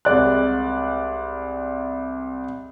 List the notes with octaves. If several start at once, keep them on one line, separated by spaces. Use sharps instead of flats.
C2 G#3 D5 F#6